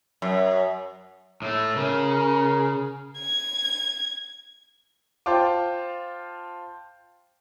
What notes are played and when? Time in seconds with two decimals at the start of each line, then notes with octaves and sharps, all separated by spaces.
0.22 F#2
1.42 A2 A3
1.76 C#3 A#4
3.19 G#6
5.26 F4 C5 F5 G5 A5 D6